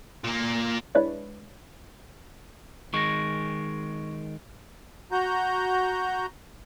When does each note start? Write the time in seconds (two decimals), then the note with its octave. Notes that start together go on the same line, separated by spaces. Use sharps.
0.24 A#2 A#3
0.95 G#3 D4 E4 B4 C#5 D5
2.94 D#3 G#3 C#6 A#6
5.12 F#4 A#5 G6